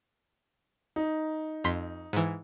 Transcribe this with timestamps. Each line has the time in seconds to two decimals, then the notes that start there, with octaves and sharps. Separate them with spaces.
0.96 D#4
1.64 F2 C6 B6
2.13 G#2 E3